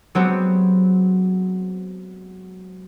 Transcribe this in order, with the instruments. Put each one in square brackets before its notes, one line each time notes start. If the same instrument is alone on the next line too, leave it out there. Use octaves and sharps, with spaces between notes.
[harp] F#3 G#3 B3 C4 F#4 G4